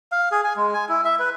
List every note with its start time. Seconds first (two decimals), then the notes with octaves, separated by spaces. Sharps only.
0.12 F5
0.32 G#4
0.44 G#5
0.57 G#3
0.74 G#5
0.89 E4
1.05 E5
1.19 B4